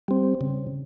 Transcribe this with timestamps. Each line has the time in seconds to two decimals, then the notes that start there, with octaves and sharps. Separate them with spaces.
0.08 G3 C4
0.41 C#3